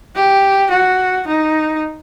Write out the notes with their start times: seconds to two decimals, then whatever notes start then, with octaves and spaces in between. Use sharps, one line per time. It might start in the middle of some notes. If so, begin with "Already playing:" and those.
0.15 G4
0.71 F#4
1.27 D#4